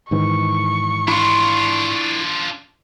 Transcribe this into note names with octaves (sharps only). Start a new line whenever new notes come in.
G#2 D#3 E3 C#6
D4 E4 F4 C6